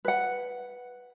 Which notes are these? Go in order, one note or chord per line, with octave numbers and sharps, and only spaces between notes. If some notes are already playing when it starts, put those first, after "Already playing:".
B4 F#5